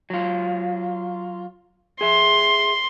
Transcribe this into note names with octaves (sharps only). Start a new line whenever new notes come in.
F#3 F4
G#4 E5 C6